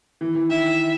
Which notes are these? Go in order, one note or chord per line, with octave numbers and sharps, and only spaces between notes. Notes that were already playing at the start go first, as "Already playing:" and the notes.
E3
E3
D#3 E5